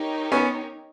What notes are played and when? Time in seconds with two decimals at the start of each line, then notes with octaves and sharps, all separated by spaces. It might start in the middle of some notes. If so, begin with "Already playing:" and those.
Already playing: D#4 G4 A#4 C#5
0.32 B3 C#4